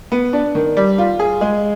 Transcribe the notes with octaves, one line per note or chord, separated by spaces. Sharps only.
B3
D4
D#3
G3
F4
G#4
G#3